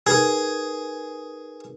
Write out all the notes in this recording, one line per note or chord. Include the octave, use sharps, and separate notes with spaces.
D#4 G#4 A#4 B4